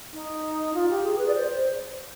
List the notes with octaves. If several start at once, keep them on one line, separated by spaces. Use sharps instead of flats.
D#4
F4
G4
G#4
B4
D5
C5